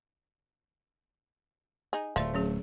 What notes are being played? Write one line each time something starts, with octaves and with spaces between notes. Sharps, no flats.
D#4 G#4
D1 F3 A3 D5 E5
F#3 C#4 G#4